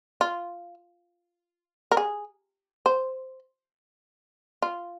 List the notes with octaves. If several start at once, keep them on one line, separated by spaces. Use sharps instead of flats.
F4
A#4
G#4
C5
F4